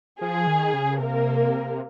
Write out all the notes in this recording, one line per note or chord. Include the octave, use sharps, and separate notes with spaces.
F3 G#4
D#3
C#3
C3 A#3 A#4